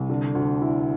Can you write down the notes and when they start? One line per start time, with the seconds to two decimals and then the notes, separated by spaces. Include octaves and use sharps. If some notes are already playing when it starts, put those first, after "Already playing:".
Already playing: C2
0.10 D3
0.35 D2
0.61 E4